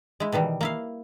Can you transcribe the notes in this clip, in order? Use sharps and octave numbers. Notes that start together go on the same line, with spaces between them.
G#3 E4
B2 D#3 E3 G3
A#3 E4 F5